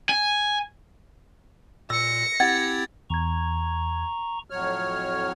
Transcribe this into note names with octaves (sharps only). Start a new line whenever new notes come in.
G#5
A#2 E6 A#6 C#7
C4 E4 G4 F#5 G#6 A6
E2 A#5 C#6 G#6
F2 A2 F#3 C#5 F6